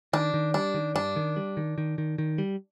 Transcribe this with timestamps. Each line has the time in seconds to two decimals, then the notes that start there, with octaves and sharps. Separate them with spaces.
0.13 D#3 D4
0.34 D#3
0.54 G3 D4
0.74 D#3
0.95 G2 D4
1.16 D#3
1.36 G3
1.57 D#3
1.78 D#3
1.98 D#3
2.18 D#3
2.38 G3